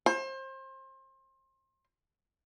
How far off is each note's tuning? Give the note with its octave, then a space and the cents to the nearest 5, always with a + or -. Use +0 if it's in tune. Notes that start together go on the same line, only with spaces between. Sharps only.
C5 +30